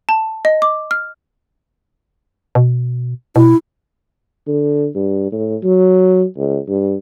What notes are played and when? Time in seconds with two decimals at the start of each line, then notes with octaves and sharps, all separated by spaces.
0.09 A5
0.45 D#5
0.62 D6
0.91 F6
2.55 B2
3.36 B2 E4
4.47 D3
4.95 G2
5.32 A2
5.63 F#3
6.37 C#2
6.68 G2